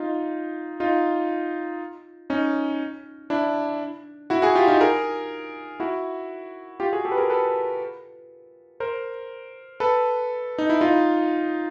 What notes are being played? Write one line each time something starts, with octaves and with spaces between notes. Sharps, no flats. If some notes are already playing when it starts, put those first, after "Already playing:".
Already playing: D#4 F4
D#4 F4
C#4 D#4
D4 E4
E4 F#4
F#4 G#4
F4 G4
D#4 F4
G#4 A#4
E4 F#4
F4 G4
F#4 G#4
G4 A4
B4
G#4 A#4
A4 B4
A#4 C5
A4 B4
D#4
E4
D#4 F4